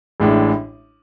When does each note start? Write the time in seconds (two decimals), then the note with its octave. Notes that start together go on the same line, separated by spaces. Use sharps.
0.20 A1 A2 G#3 D4